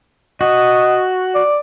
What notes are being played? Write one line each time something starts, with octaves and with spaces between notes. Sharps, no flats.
F#4 D#5
D5